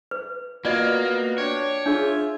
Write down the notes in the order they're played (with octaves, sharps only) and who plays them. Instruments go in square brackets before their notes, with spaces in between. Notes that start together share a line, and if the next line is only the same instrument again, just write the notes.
[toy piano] B4
[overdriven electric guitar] A#3 [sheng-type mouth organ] B3 F#4 [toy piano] F4 D5 D#5
[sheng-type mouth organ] D4 G5 [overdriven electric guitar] C#5
[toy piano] D4 G#4 [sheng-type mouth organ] F4 E5